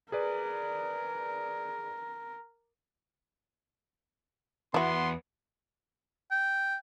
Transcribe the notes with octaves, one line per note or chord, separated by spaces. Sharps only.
G#4 A#4 B4 D5
E2 B3 E4 F#4 C6
G5